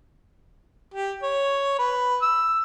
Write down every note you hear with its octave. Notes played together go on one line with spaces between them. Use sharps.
G4
C#5
B4
E6